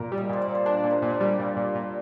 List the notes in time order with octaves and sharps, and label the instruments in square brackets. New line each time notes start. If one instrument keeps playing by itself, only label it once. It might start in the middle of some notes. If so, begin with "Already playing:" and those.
Already playing: [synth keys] A#2 [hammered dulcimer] A#4
[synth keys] G3
[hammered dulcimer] D#5
[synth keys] A#2 [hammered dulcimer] C5
[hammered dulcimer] D5
[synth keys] A#2
[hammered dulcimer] C5
[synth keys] D4 [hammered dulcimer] A#4
[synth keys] A#2
[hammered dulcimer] A#4
[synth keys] A#2
[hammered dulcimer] F4 G4
[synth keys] G3
A#2
A#2
A#2